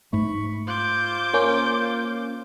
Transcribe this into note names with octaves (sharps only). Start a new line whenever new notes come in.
G#2 A3 B5 C#6
F4 C5 D6 G6
A#3 C#4